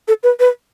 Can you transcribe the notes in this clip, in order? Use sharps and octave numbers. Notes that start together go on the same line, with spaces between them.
A4
B4
B4